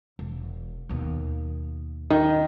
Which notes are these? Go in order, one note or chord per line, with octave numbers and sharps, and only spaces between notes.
E1
D#2 B2
D#3